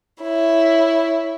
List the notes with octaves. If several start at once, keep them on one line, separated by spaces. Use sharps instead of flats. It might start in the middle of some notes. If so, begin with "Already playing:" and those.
E4 C#5